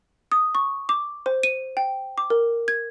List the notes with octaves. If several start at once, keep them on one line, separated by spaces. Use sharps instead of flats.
D#6
C#6
D6
C5
D#7
G5
D6
A#4
G#6